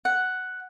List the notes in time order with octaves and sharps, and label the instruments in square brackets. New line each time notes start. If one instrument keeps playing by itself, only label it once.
[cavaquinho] F#5